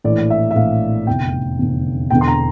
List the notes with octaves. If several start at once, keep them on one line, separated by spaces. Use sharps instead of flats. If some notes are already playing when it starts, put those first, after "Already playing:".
A#1 A2 E3 D5
E5
E5
A#1 A2 E3 F5
F1 E2 D3 G5
F1 E2 D3
E1 E2 D3 G5
C6
A#5